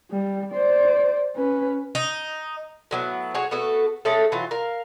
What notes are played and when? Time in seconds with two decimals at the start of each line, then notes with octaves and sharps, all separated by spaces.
0.11 G3
0.53 C5 D5
1.37 C#4 B4
1.95 D#4
2.91 A2 F#3 B3
3.35 F#4 G#4 C#5
3.51 A3 B3 F#4 A4
4.05 G#3 A3 C#4 A4
4.32 E3 F#3 F4
4.51 A#4 F5